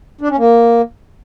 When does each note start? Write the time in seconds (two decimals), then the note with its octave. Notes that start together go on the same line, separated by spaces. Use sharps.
0.21 D4
0.30 C#4
0.38 A#3